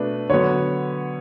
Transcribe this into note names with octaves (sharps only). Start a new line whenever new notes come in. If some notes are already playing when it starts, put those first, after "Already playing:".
Already playing: B2 A3 D4 B4
D3 F#3 B3 C#5